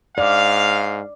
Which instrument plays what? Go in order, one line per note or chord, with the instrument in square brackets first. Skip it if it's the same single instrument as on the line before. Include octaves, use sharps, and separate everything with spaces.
[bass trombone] G#2 [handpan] D5 [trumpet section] F5